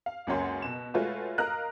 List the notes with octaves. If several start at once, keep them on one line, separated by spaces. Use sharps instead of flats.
F5
C#2 F#2 A#3 C#4 F#5 C6
B2 E7
G#3 A3 F4 F#4 B4 C#5
A#4 D#5 F5 A#5 F6 F#6